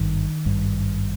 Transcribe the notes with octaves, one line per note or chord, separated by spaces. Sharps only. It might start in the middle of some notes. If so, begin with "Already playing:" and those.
Already playing: G#1 G2 D#3
G#1 G2